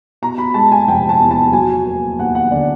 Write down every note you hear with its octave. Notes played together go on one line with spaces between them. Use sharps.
B2 A#5
B5
G#3 A5
G#5
F1 G5
A5
E2
A5
F#3 G#5
A#3
D#2 F#5
F#5
D3 D5